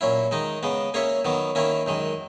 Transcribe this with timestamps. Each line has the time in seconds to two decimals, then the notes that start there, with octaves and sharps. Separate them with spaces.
0.01 A#2 F#3 C#4 E4
0.31 D#3 G#3 D#4
0.63 C#3 G#3 B3
0.94 A#3 C#4 G#4 C#5 E5
1.25 D#3 F#3 B3
1.55 D#3 A#3 C#4 E4
1.86 F#2 D#3 G#3